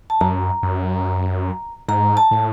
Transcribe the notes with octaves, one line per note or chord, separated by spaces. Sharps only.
A5
F#2 A#5
F#2
G#2 A#5
A5
A2